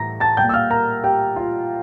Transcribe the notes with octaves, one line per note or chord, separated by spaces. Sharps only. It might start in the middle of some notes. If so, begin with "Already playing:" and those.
Already playing: A2 E3 G3 A#5 A#6
A5 A6
A#2 G3 A#3 G5 G6
E6
F5 F6
A#4 A#5
G4 G5
F4 F5